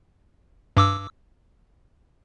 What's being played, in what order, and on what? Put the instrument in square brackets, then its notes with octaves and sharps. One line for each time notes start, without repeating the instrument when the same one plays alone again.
[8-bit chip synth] G2 D6 E6